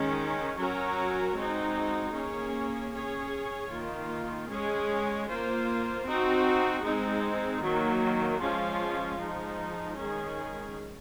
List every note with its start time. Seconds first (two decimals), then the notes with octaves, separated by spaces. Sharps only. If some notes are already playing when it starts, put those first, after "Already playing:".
Already playing: D#3 G#3 C#4
0.58 F#3 C#4 F#4 A#4 C#5
1.36 G#3 C4 D#4 F#4
2.14 A#3 C#4 G#4 C#5
2.92 C#4 G#4 C#5
3.70 D#3 A#3 F4
4.49 G#3 C#4 G#4 C#5
5.28 A#3 F4 C5
6.06 C4 D#4 F#4
6.84 G#3 C4 D#4
7.62 D#3 F#3 A#3
8.40 F3 G#3 C#4 F4
9.18 F3 G#3 D#4
9.96 D#3 G#3 C#4 G#4